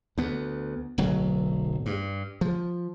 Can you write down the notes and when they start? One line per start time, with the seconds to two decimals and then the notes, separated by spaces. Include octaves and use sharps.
0.18 D2 B3
0.98 D1 B1 F#3
1.86 G2
2.41 F3